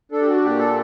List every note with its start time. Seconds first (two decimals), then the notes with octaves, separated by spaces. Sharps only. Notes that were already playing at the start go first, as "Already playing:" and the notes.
0.12 D4 A4
0.21 G4
0.27 F#4
0.43 A#2 G4
0.59 A4